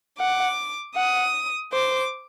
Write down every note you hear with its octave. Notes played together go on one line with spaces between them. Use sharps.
F#5 D6
F#5 D#6
C5 D6